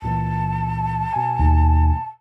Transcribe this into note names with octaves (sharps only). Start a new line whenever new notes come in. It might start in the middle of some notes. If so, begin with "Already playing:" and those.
C#2 A#2 E3 A5
B2 G#5
D#2